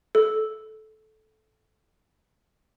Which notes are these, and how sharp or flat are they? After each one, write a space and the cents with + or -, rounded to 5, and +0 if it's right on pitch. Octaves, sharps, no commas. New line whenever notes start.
A4 -15